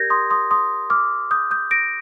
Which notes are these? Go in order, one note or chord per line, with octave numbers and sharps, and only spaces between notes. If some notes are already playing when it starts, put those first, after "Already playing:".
Already playing: G4 A#4 D5 G6 G#6 A#6
C6 D#6
C6 D#6
C6 D#6
D6 F6
D#6 G6
D#6 G6
A#6 D7